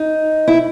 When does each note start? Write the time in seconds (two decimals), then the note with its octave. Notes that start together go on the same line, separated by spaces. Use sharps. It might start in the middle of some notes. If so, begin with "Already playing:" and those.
Already playing: D#4
0.48 E4